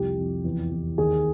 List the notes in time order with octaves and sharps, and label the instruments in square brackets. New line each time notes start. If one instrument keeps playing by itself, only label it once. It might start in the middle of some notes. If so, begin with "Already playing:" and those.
Already playing: [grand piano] C2 F2 G4
F2
E2
E2
D#2 G#4